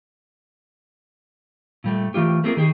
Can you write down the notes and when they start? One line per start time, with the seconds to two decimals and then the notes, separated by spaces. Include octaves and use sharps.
1.84 A#2 G3 A3
2.14 E3 A3 F4 G4
2.44 A3 A#3 C4 F4 G#4 A#4
2.57 D#3 G4 G#4